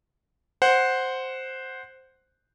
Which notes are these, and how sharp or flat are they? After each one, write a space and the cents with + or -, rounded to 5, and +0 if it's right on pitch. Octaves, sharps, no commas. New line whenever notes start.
C5 +0 F#5 +0